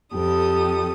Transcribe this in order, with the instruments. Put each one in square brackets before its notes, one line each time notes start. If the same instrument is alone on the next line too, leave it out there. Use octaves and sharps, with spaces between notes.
[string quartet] F2 G4 A4 D#6